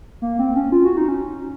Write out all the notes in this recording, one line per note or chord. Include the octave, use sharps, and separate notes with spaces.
A#3
C4
C#4
F4
F#4
D#4
C#4